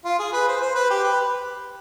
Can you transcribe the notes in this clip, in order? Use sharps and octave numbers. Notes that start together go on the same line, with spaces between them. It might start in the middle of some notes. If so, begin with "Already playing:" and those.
F4
G#4
B4
C5
C5
B4
G4
B4